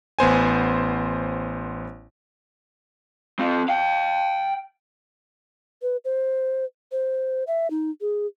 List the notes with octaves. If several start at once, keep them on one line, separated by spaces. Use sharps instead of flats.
A1 B3 C5 G#5
C4 F4
F5 G5
B4
C5
C5
E5
D#4
G#4